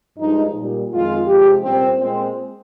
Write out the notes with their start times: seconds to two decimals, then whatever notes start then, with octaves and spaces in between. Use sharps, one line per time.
0.18 G2 F3 G#3 D#4
0.54 A#2 G3
0.90 F2 D#3 G#3 F4
1.27 C3 F3 G#3 G4
1.63 A#2 G3 C4
1.99 A#2 G#3 C4